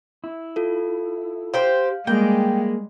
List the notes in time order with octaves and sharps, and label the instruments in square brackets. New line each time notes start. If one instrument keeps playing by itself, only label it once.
[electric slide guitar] E4
[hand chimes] F4 A4
[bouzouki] G4 C5 [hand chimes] F5
[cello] G3 G#3 [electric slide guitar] A#3 G#4 [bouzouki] G5